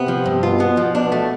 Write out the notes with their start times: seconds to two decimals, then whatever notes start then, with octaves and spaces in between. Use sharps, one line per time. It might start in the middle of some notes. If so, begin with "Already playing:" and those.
Already playing: C3 B3
0.08 F3
0.26 G2
0.43 B2 F4
0.60 B3
0.77 F3
0.95 B2 D4
1.12 A3